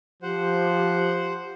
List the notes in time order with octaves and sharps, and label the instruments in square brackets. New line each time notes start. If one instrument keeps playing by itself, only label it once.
[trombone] F3 [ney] G4 [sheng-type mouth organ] C5 F#5